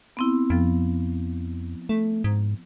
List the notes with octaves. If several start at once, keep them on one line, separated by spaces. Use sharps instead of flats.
B3 C4 E4
F2 F3 B3
A3
G#2